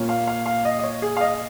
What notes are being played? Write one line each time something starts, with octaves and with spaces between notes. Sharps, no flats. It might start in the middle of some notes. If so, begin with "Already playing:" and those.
Already playing: A#2 A#3 C#4
F5
F5
F5
D#5
D#5
C#5
G#4
F5
D#5